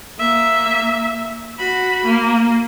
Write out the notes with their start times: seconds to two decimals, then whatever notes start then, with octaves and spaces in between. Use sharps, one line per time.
0.19 A#3 E5
1.59 F#4 B5
2.05 A#3